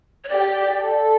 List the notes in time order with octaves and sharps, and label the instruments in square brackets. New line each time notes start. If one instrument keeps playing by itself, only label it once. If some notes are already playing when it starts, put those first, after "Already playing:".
[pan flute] C#5
[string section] G4 [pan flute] D5
[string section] A4